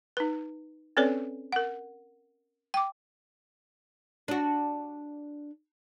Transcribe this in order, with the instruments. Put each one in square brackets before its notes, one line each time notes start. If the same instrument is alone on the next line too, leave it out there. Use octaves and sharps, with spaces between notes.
[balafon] D#4 B4
C4 C#4 A4 B4 C#5 D5
A#4 F#5
G5 D6
[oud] D4 F#4